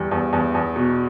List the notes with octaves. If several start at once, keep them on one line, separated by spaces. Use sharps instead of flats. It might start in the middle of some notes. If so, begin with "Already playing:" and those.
Already playing: E2 G3
E2
E2
E2
B2